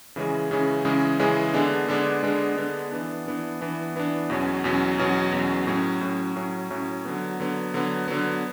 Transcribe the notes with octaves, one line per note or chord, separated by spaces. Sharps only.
C#3 E3 G#3 C#4 G#4
C#3 E3 G#3 C#4 G#4
C#3 E3 G#3 C#4 G#4
C#3 E3 G#3 C#4 G#4
D3 G#3 B3 D4
D3 G#3 B3 D4
D3 G#3 B3 D4
D3 G#3 B3 D4
E3 B3 D4
E3 B3 D4
E3 B3 D4
E3 B3 D4
E2 B2 F#3 C#4
E2 B2 F#3 C#4
E2 B2 F#3 C#4
E2 B2 F#3 C#4
A2 F#3 C#4
A2 F#3 C#4
A2 F#3 C#4
A2 F#3 C#4
D3 F#3 B3
D3 F#3 B3
D3 F#3 B3
D3 F#3 B3